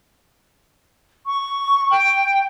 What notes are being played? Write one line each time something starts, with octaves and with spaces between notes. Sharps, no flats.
C#6
G5